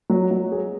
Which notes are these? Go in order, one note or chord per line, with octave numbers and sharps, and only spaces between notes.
F#3
F#3
G#4